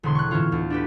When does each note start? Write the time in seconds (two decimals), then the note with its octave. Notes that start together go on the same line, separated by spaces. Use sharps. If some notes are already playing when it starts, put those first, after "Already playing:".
0.03 E1 D3 G#4 C6
0.15 C#6 F#6
0.31 A2 E3 C#4 F4
0.52 D2
0.70 D4 G4 B4